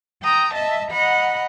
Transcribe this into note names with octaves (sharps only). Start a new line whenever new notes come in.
G5 A#5 D#6
D#5 E5 A5
D#5 F#5 A#5 B5